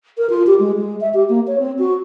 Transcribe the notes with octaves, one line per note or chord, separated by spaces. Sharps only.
A#4
F4
G4
G#3
G#3
E5
G4
A#3
C#5
C4
F#4